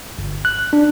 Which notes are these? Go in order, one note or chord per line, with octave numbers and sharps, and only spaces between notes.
G1
F#6
D4